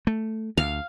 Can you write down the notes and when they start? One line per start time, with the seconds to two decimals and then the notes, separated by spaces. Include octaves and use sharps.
0.07 A3
0.58 D2 F5